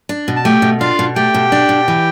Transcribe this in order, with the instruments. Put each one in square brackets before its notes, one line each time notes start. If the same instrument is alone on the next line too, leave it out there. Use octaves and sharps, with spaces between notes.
[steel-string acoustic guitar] D4
B2
[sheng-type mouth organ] A5
[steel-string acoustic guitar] A3 [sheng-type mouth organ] G4 G5
[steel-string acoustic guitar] B2
[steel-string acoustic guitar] D4 [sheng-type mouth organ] F4 F5
[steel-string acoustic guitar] B2
[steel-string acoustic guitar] A3 [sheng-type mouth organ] G4 G5
[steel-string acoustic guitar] B2
D4
B2
E3